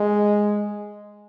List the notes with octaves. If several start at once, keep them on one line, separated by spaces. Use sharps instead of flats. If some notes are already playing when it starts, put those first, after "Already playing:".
Already playing: G#3